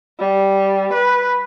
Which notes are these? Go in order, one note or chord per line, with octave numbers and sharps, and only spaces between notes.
G3
B4